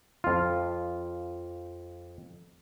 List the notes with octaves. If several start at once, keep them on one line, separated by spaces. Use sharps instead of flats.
F2 F4